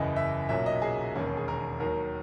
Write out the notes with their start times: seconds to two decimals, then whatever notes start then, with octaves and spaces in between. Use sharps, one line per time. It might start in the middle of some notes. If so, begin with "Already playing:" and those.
Already playing: F#1 E2 C#3 E3 D#5
0.16 E5
0.49 B1 A#2 F#3 E5
0.66 D#5
0.82 G#4
1.15 E1 D#2 D#3 C#4
1.26 C#4
1.37 G#4
1.48 A#4
1.80 D#2 D#3 F#3 A#4